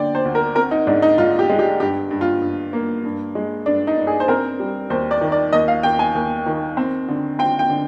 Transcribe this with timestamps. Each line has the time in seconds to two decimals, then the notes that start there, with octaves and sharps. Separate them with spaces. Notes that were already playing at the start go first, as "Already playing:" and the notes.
Already playing: D3 A#3 D5 G5
0.15 C5
0.25 D2
0.35 A#4
0.55 C4 A#4
0.71 D#4
0.87 G#2 D4
1.02 D#4
1.18 G#2 F4
1.39 G4
1.49 G#3
1.59 G4
1.80 G2 G4
2.11 G2
2.21 F4
2.42 G2
2.73 A#3
3.05 G2
3.35 G#3
3.66 G2 D4
3.87 D#4
3.98 G2
4.07 G#4
4.20 C5
4.28 C4 A#4
4.59 G3
4.90 D#2 C5
5.11 D5
5.21 D#3
5.32 D5
5.53 D#2 D#5
5.68 F5
5.83 D#2 G5
5.99 G#5
6.15 D#2
6.46 D#3
6.77 C4
7.08 D3
7.39 C4 G5
7.59 G5
7.70 D3